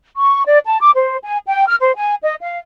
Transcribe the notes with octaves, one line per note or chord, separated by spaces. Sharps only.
C#6
D5
A5
D6
C5
G#5
G5
F6
C5
G#5
D#5
F5